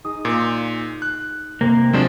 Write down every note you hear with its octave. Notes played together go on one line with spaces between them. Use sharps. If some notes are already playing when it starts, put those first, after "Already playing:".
D#4 G#4 D#6
A#2 C6
F#6
C3 A#3
F3 F#3 G#3 C4 D4